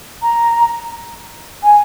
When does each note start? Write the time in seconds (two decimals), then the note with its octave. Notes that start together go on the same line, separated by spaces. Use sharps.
0.22 A#5
1.63 G#5